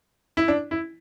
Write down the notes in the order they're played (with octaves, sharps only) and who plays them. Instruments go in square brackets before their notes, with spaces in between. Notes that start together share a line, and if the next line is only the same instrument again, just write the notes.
[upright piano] E4
D4
E4